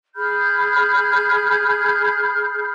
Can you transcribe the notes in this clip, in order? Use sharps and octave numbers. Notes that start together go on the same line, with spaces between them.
G#4 B5 F6 G6